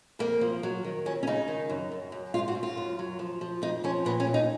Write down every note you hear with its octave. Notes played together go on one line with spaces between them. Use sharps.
F2 A#3
F3
F#3
D#3
F2 C#4
C#4
C#3 D#4
D#3
F#2
F#2
F#2
G#2 F4
F#4
G#2
F4
F#2
F#3
F3
F3
F2 D#4
F3 C#4
A#2 B3
C#4
A#2
D#4